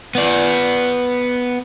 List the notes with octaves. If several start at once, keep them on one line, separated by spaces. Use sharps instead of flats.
B3 D5